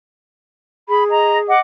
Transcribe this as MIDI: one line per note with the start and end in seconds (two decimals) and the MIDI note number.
0.89 1.51 68
0.89 1.03 83
1.10 1.37 75
1.10 1.37 82
1.47 1.58 75
1.47 1.58 78
1.47 1.58 86